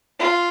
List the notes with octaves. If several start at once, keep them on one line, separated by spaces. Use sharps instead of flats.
F4